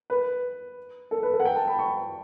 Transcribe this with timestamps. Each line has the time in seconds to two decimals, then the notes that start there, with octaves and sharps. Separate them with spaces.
0.10 B4
1.11 A4
1.23 B4
1.34 A4
1.40 F#5
1.45 G5
1.56 A5
1.68 B5
1.79 C#6